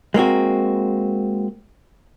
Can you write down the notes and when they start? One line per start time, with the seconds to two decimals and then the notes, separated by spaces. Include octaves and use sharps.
0.14 G#3 A#3 C4 F#4